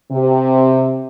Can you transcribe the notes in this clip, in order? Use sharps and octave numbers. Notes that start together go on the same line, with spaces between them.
C3